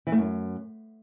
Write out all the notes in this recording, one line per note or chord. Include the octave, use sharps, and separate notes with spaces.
E3
A3
F#2